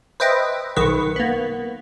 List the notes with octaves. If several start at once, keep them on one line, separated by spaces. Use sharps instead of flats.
B4 C5 D#5 E5 G5
B1 D#3 B4 C#6
A#3 B3